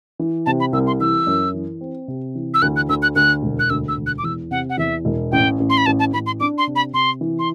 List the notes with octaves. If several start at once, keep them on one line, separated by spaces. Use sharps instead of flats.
E3
C3 A5
B5
C2 E6
C6
E3 E6
F#2
E3
C4
C3
E3
E6
D2 F#6
F#6
D2 E6
F#6
D2 F#6
E1
F#6
D2 E6
E6
E1
F#6
D6
E2 E6
C3 F#5
F#5
E2 E5
E1
A1 G5
A1
C6
B5
A1 A5
A5
A1 B5
C6
D4 D6
C6
C3
B5
C3 C6
E3
C6